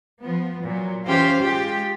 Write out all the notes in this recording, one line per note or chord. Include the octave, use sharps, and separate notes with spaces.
F3 B3
A#2 F#3
E3 C#4 F4 G4 C5 F5
G#3 F4 G4